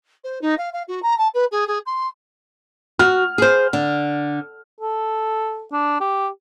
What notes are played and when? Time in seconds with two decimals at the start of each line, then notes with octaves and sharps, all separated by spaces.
0.24 C5
0.42 D#4
0.58 F5
0.73 F5
0.88 F#4
1.03 A#5
1.18 A5
1.34 B4
1.52 G#4
1.67 G#4
1.86 C6
2.99 F#4 F6
3.38 G#4 C5
3.73 D3
4.81 A4
5.72 D4
6.01 G4